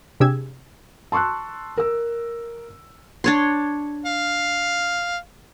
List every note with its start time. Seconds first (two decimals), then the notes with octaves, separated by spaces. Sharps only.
0.20 C3 D4 G4 G#4 E6 G#6
1.12 A5 C6 C#6 E6 F#6
1.77 A#4 E6
3.24 D4 C#5 C6
4.06 F5